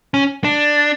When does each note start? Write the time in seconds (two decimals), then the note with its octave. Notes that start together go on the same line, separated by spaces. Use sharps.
0.14 C#4
0.44 D4